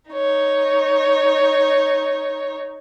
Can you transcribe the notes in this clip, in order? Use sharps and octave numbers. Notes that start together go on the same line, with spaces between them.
D#4 C#5